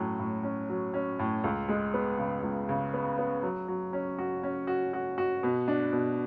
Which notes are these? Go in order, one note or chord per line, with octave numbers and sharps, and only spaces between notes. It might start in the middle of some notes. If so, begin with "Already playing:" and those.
Already playing: A2 F#3 C#4
A2
C#4
F#3
C#4
A2
C#2
G#3
B3
C#3
C#2
C#3
B3
B3
F#3
F#3
C#4
F#4
C#4
F#4
F#4
F#4
B2
D4
B2